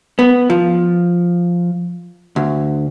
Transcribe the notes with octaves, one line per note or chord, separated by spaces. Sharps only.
B3
F3
D2